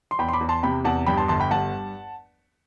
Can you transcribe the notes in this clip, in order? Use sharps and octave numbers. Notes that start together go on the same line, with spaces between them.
C6
E2 G5 B5
C6
B5 D6
E2
A5 C6
C3 G5 B5
E2 F#5 A5
G2 G5 B5
A5 C6
G1 A5 C6
G5 B5
G2 F#5 A5